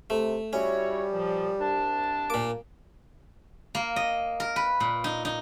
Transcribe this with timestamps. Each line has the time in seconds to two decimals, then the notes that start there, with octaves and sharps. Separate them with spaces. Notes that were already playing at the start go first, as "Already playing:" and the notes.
0.10 C3 A3
0.53 G3 C#4 E4 F#4 C#5
1.13 A#2 F3
1.59 C2 D4 A5
2.30 A#2 A#3 D6
3.75 A#3
3.96 D#5
4.40 A#4
4.56 B4
4.80 A#2
5.04 D#4
5.25 D#4